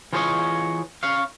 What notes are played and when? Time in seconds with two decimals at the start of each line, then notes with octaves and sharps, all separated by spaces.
0.13 E3 F4 G#4 C5 C#5 D#5
1.03 C#4 C#5 F5